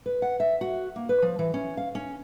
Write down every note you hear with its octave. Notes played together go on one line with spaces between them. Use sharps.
B4
F#5
E5
F#4
A#3
B4
F3
E3
C#4
F5
C#4